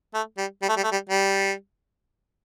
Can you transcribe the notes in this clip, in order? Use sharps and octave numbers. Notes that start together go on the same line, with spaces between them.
A3
G3
G3
A3
G3
A3
G3
G3